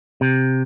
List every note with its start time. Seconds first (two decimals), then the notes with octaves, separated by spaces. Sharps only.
0.21 C3